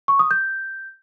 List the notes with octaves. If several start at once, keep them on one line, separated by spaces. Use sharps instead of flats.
C#6
D#6
G6